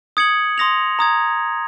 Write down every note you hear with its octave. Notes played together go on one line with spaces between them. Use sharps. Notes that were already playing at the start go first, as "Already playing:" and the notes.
D#6 G#6 C#7 F#7
C6 D#6 A#6 F7
A#5 D#6 G#6